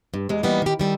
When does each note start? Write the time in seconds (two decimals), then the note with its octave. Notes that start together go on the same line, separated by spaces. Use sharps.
0.14 G2
0.29 E2 G2 G#3
0.43 E3 G3 A#3 B3 D#4
0.62 D#3 G4
0.79 D#3 G3 A4